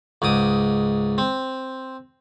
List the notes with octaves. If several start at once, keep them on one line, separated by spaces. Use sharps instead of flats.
C#2 G#2 D6 D#6
C4